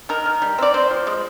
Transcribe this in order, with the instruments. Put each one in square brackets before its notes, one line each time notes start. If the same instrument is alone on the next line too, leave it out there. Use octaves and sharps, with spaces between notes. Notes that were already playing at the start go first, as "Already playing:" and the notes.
[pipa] D#3 A#4
D#3
G3
C4 D5
C4 C5
F3
G#3